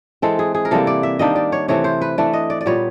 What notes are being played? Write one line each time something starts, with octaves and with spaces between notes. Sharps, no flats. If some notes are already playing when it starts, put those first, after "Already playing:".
E3 G#3 C4 A4
G#4
G#4
A#4
C3 E3 G3 A#3 A4
D5
E5
D#3 G3 A#3 D4 D#5
D5
C#5
C3 E3 A3 C4 C#5
C5
B4
E3 A3 D4 D5
D#5
D5
D5
A#2 G3 B3 C#5